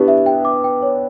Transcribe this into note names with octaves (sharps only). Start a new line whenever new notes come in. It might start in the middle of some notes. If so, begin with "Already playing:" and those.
Already playing: B3 D4 E4 G4
E5
G5
D6
G5
C#5